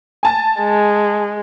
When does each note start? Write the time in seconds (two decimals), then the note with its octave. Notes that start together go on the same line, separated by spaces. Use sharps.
0.23 G#5 A5 A6
0.59 G#3